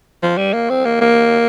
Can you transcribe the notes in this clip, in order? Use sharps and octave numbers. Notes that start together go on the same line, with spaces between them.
F3
G3
A#3
C4
A#3
A#3